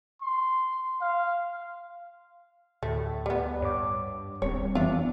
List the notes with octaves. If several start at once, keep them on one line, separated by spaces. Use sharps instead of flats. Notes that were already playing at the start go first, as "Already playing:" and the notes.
C6
F5
D2 A2 A3
G3 B3
G2 C#5 D6
D#1 G3 C4 C#5
F2 E3 B3 D4 F4 E5